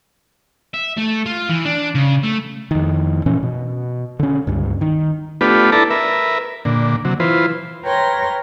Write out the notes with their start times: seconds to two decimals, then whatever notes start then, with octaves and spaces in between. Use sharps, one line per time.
0.74 E5
0.98 A3
1.26 F4
1.49 E3
1.65 D4
1.95 C#3
2.24 A3
2.71 F2 D#3
3.26 A#2 E3 C#4
3.43 B2
4.19 D3 C#4
4.47 C#2 G2
4.81 D#3
5.41 A3 B3 D4 F4 G4 B4
5.72 E4 A4 B4 D5 A5 A#5
5.91 A#4 B4 E5
6.65 A#2 D3
7.05 C3 F#3
7.20 E3 F4 B4 C5
7.84 A#4 B4 C#5 G5 C6 A#6